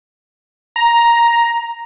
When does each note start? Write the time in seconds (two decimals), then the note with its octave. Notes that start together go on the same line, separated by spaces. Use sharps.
0.76 A#5